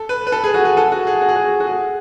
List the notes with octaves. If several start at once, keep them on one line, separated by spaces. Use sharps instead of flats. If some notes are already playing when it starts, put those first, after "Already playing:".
Already playing: A4
B4
B4
A4
G#4
F#4
G#4
A4
F#4
G#4
F#4
G#4
F#4
F#4
G#4